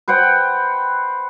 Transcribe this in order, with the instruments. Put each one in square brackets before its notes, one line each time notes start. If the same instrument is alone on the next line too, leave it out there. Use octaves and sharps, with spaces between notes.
[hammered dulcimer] B4 C5 F#5 G5